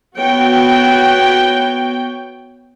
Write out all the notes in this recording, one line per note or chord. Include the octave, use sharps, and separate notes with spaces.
B3 F#4 C#5 G5